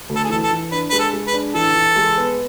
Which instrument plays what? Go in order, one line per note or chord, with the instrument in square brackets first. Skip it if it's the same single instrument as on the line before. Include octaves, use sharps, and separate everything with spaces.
[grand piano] D2
[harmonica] A4
G#4
[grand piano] E3 [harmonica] A4
[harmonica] A4
[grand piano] E3
[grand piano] D4 [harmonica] B4
[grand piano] G#3 [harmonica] B4
[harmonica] A4
[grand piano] G#3
[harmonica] B4
[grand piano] D4
[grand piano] E3 [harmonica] A4
[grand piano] E3
G#3
B3